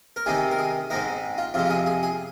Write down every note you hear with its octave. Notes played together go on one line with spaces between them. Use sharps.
A#4
C3 D#3 G#3 C4 D#4 G#4
A#4
G#4
G#2 G#3 C4 D#4 A#4
F4
F2 C3 F3 G#3 F4
F4
G#4
G#4
G#4